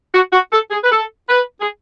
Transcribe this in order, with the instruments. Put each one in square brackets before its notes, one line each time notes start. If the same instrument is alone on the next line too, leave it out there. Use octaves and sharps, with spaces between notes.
[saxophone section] F#4
F#4
A4
G#4
B4
A4
B4
G#4